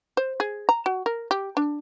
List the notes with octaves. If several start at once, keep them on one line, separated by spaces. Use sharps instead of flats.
C5
G#4
A#5
F#4
A#4
G4
D4